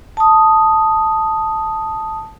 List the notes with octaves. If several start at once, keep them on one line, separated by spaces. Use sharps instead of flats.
A5 D#6